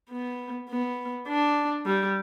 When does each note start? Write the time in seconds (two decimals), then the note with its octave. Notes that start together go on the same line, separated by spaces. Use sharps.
0.11 B3
0.69 B3
1.28 D4
1.86 G3